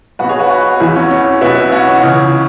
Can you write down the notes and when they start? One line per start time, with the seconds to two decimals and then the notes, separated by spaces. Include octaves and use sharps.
0.19 B1 F#4 B4
0.23 B2
0.29 G#4 C#5
0.39 F#4 B4
0.50 F#4 B4
0.80 E1 E2 E3 E4 G#4
0.96 C#4 F#4
1.11 C#4
1.41 B1 B2 B3 E4
1.72 C#4 F#4
2.02 C#2 C#3 E3 C#4